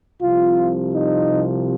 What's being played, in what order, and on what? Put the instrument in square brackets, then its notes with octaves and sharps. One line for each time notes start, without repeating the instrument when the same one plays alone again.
[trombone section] C2 C3 F3 F4
D#4